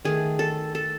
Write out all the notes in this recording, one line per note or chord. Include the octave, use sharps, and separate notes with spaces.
D#3 A3 G#4
A4
A4